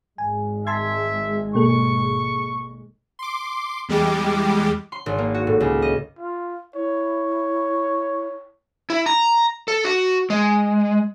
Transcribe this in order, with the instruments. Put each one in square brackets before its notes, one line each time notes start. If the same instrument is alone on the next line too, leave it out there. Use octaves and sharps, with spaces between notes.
[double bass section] G#1 G#3 [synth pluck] G#5
[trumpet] E5 [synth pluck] A5 C6 G#6
[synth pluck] B2 A#3 A4 [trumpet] C#6
[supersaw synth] C6 D6
E2 G3 G#3 G4 D6
[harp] C6
G#1
A#3
F#4
A2
C#2
D#5
[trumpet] F4
[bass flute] E4 [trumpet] C#5
[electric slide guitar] E4
A#5
A4
F#4
G#3